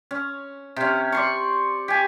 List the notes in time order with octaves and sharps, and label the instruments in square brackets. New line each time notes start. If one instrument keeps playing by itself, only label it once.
[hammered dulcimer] C#4
C3 C#4
D5 C6 C#6
G4 G#5